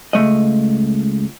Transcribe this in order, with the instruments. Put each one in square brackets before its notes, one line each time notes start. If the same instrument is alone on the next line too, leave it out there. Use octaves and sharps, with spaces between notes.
[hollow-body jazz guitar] C#2 A3 D#5